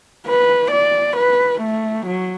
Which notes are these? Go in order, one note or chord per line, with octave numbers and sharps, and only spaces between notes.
B4
D5
B4
A3
F#3